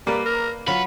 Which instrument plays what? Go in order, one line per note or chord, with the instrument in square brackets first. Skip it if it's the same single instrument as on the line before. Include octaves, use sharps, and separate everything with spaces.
[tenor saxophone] G3 [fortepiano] A#3 [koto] B4 D5
[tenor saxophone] A#4
[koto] F#3 C#5 [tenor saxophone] F4 [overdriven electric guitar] B4